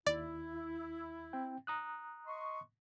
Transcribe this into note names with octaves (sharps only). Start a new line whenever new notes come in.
D#2 E4 D5
C4 G5
A#5 D#6 F#6
D#5 C6 C#6